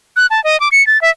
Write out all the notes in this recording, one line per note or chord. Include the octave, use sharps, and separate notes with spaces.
F#6
A5
D#5
D6
C#7
A6
E5